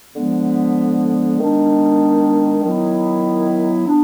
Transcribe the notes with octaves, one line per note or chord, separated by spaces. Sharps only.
D3 F3 G#3 B3
D#3 G#3 B3 D4
D#3 F#3 B3 E4
B3 D4